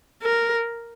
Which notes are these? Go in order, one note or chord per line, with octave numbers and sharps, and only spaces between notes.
A#4